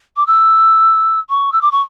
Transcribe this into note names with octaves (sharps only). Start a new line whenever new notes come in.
D6
E6
C#6
E6
D6
C#6